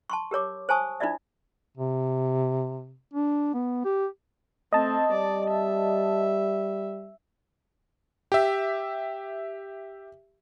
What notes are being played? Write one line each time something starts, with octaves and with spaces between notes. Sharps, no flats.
A5 C6 C#6
G4 A#4 C#5 D6
C5 G#5 A5 C#6 D#6
D4 E4 F4 D5 E5
C3
D4
B3
G4
A3 C4 D#5 A5
G3 D5
E5
G4 E5